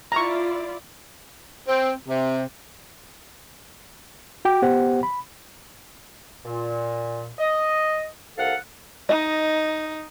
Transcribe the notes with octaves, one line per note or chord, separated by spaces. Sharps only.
E4 F4 D5 A#5 C#6
C4
C3
F#4 G5 D6
B3 G4 C5 F#5
B5
A#2
D#5
C2 A4 F5 F#5
D#4 D#5